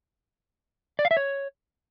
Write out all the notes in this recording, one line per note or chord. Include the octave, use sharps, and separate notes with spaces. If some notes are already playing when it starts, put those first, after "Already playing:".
D5
F5
E5
C#5